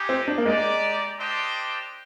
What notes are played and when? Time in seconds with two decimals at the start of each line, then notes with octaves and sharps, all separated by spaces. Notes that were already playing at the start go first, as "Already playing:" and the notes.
Already playing: G#3 D#4 G4
0.09 C4
0.28 D4
0.38 A#3
0.45 G#3 D#4 G4 D5
1.19 D4 G4 C5 D#5 G5